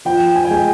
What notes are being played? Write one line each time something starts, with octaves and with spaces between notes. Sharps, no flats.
F3 G5
G#5
G5
G#3 G#5